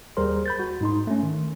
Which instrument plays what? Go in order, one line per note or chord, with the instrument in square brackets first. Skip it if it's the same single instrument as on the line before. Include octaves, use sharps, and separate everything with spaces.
[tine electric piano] D#2 G3 G#4 A#4 C5 C6
B5 G6 A6
F#4
G#2 D#4 C6
A3 C#4
D#3